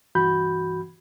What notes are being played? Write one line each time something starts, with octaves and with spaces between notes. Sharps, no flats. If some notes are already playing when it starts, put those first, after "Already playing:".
C2 G2 E3 F#4 B5 G6